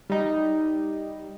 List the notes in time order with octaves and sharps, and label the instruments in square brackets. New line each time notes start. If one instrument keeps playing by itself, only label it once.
[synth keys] G3 D#4